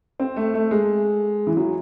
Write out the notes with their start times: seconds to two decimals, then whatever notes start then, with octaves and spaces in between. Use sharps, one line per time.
0.20 C4
0.36 A3
0.54 A3
0.71 G#3
1.47 E3
1.57 F#3